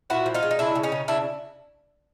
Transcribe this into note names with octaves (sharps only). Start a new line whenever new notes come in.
A#2 E4 F#4
F3
D#4 F4
G#3
D#4
C#3 D4 E4
C#3
C#4 D#4
C#3
C#3 D4 E4